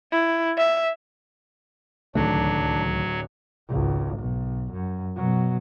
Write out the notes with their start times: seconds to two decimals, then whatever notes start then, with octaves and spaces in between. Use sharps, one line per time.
0.12 E4
0.58 E5
2.15 D1 C#2 D#3 F#3 A3 D4 F#4
3.69 G#1 C#2
4.17 B1
4.72 F#2
5.16 B2 F#3